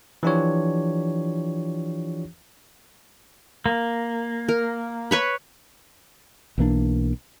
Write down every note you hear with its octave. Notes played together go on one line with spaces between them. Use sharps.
E3 F3 D4 F4 G4 C#5
A#3
A#4
B4 C#5 B5
B1 E3 A#3 D4